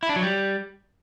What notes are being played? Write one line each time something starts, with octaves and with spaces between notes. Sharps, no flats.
E4
D4
F#3
G3